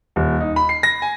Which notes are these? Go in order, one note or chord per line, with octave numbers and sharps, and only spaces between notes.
D#1
D#4
B5
C7
A#6
G#5